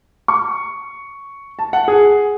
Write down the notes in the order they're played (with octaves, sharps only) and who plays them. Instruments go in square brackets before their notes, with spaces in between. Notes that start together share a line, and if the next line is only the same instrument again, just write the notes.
[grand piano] C#6
A5
F#5
G#4